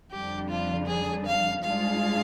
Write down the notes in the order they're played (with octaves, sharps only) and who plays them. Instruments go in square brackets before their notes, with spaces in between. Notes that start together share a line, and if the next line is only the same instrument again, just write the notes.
[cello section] F2 D3 G3 D4 [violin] G4
[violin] F4
G#4
F5
[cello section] G#2 G3 D4 F4 G#4 [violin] F5